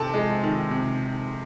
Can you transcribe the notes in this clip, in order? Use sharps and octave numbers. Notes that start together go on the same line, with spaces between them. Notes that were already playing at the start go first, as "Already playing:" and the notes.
Already playing: C3 C4 A4 A5
G#3
D#3
C3